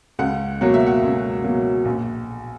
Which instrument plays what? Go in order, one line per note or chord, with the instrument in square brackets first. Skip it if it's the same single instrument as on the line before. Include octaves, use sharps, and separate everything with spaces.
[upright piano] C#2 F#5
B2 F#3 A#3 C#4 F#5
E5
F#5
C#2
B2 F#3 A#3 C#4
A#1